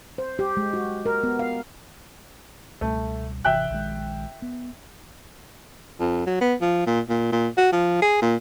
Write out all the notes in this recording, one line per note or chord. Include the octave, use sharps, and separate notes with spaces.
C5
G4
G#3
F#4
A#4
B3
F5
C#2 B2 G3 A3
G#1 C3 E3 E5 G5 F#6
A#1 D#3 G#3
B3
F2
F#3
B3
F3
A#2
A#2
A#2
F#4
F3
G#4
A#2